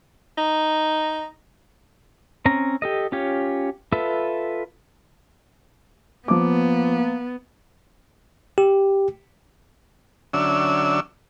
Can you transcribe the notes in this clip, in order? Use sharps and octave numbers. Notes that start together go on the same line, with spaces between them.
D#4
C4 C#4 A#5
G4 A4 D#5
C#4 F4 G4 C#5
F4 A4 B4 E5
F3 A#3 B3 D6
G4
D3 F#3 C#4 D4 E5 E6